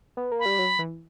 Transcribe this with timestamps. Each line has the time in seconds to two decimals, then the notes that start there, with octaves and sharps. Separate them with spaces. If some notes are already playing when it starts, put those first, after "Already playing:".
0.17 B3
0.31 A#3
0.39 B5
0.45 G3
0.59 F#3
0.79 E3